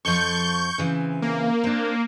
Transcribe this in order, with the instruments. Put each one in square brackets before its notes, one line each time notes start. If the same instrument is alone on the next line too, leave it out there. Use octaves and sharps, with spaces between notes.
[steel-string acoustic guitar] F2 F3 [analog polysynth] C#6 G6
[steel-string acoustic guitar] C#3 E3 C4
[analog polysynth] A#3
[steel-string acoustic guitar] C4 D4